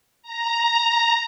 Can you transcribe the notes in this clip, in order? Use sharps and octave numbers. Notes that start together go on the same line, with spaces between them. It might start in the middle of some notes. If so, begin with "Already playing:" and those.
A#5